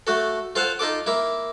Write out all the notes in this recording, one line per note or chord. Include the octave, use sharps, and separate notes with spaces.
A3 F#4 A4
F4 A4 C5 F5 F#5
D#4 F4 A4 D6
A#3 E4